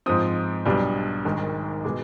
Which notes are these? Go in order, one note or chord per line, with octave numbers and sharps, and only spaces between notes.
G#2 F3 C4 D#6
B1 B2 G3 D4
G#1 G#2 D#3
B2 G#3 D6